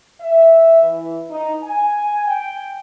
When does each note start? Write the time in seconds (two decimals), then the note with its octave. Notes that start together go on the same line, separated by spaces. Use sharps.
0.21 E5
0.82 E3
1.30 D#4
1.64 G#5
2.28 G5